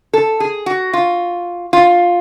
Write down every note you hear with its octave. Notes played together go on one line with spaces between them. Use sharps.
A4
G#4
F#4
F4
F4